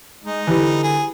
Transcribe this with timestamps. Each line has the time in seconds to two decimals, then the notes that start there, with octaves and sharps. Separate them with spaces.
0.24 G#3 D#4
0.47 D3 E3 G3
0.83 G#4